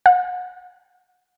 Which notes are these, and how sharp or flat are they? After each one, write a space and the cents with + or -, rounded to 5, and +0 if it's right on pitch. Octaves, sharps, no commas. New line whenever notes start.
F#5 -30